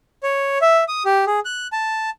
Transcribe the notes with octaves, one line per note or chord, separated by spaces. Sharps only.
C#5
E5
D#6
G4
G#4
F#6
A5